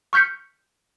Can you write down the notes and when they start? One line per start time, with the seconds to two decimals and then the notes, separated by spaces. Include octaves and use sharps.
0.13 C#6 F6 G6 B6 C#7